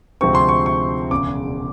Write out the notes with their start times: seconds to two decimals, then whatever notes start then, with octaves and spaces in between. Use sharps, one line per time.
0.21 D2 C3 F3 G#3 C4 C#6
0.35 C6
0.49 C#6
0.66 C#6
1.11 E1 E2 C#3 D6